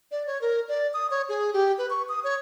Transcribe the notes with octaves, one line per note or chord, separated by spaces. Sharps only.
D5
C#5
A#4
D5
D#6
C#5
G#4
G4
B4
C#6
D#6
C#5